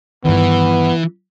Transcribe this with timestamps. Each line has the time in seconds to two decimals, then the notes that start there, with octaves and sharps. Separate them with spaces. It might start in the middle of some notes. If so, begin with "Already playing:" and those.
0.25 G2 D#3 E3 B3